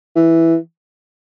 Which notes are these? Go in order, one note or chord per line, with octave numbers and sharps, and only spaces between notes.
E3